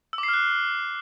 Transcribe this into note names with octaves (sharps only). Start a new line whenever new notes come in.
E6
D6
C7
F6
F#6